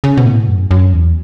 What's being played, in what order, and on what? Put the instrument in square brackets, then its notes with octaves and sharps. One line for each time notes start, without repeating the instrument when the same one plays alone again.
[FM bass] C#3
B2
A2
F#2
F#2
E2